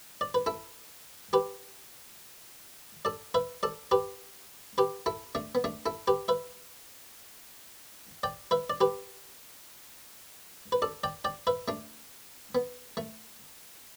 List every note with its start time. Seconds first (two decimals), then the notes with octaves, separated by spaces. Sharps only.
0.21 D5
0.34 B4
0.46 E4 A4
1.33 G4 B4
3.05 A4 D5
3.34 B4 E5
3.63 A4 D5
3.91 G4 B4
4.78 G4 B4
5.06 E4 A4
5.35 A3 D4
5.55 B3
5.64 A3 D4
5.86 E4 A4
6.07 G4 B4
6.28 B4 E5
8.23 D5 G5
8.51 B4 E5
8.70 D5
8.81 G4 B4
10.72 B4
10.82 A4 D5
11.04 D5 G5
11.24 D5 G5
11.47 B4 E5
11.68 A3 D4
12.55 B3
12.97 A3